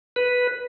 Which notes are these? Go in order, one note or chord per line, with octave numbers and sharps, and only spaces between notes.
B4